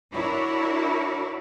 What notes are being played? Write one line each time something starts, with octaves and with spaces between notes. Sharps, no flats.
D4 E4 F#4 A#4 C#5